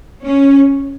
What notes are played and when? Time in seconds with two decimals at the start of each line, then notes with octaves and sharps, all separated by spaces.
0.25 C#4